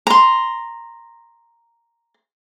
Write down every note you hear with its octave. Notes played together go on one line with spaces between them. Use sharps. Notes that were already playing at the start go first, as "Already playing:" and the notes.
A#5 C6